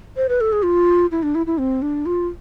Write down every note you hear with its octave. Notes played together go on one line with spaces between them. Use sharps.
C5
B4
A4
G#4
F4
E4
D4
E4
E4
C4
D4
F4